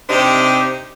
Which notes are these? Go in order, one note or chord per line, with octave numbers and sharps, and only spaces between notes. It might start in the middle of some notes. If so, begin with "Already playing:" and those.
C3 C4 D4 D#4 G4 C5